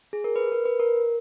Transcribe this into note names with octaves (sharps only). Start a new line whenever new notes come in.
G#4
A#4
B4
A#4
B4
A#4